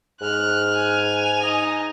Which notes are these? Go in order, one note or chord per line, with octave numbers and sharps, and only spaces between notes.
G#2 F6 F#6
G#5 F7
D#4 D#5